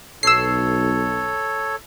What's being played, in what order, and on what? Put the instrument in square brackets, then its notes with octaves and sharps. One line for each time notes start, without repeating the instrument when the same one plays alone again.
[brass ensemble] B1 [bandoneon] A4 C#5 [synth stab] E6 C7